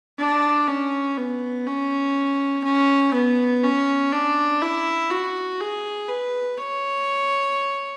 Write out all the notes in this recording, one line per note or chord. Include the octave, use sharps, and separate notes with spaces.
D4
C#4
B3
C#4
C#4
B3
C#4
D4
E4
F#4
G#4
B4
C#5